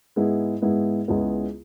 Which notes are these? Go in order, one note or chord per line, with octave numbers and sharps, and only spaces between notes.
G#2 G#3 B3 E4
G#2 G#3 B3 E4
C#2 C#3 G#3 B3 E4